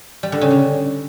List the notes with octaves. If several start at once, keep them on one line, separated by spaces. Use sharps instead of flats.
G3
D3
C#3
D3